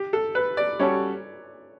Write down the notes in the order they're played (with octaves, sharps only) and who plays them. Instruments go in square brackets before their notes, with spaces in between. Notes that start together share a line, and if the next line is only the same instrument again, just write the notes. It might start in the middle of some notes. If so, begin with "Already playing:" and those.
Already playing: [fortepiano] G4
A4
B4
D5
[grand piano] G3 C#4 F#4 A4 [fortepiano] C#5